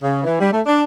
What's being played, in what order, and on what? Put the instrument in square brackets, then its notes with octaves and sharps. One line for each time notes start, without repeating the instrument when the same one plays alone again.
[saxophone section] C#3
E3
G3
A3
D4